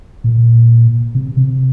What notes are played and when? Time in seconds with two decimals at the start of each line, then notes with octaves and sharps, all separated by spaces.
0.24 A#2
1.15 C3
1.37 C3